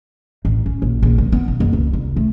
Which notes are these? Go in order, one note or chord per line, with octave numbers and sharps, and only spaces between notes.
A1
C#4
A#1
A#1
F3
B3
B1
F#1
C#2
C2
A3